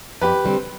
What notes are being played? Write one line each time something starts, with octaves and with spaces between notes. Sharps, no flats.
F2 G4 B4
D3 G3 C4